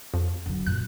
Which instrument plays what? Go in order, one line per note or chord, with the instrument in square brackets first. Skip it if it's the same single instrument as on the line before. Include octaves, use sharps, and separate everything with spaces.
[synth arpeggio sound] F2
[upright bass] D3 F#3
[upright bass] F#2 A#2 [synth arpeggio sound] F#6